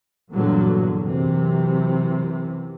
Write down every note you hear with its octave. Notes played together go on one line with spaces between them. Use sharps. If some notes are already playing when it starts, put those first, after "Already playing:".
E2 G2 A#2 D3 F#3
F#2 C3 E3